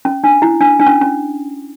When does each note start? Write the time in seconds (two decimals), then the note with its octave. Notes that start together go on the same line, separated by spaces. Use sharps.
0.05 C#4
0.24 D4
0.42 E4
0.61 D4
0.79 D4
0.87 C#4
1.01 C#4